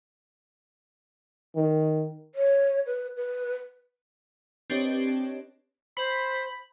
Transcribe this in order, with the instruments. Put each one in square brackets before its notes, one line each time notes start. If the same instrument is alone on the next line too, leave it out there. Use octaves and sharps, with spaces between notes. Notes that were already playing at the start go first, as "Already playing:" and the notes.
[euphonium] D#3
[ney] C#5
B4
B4
[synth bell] C4 D4 G4 B4 C#5 D#5
[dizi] C5 [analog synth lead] B5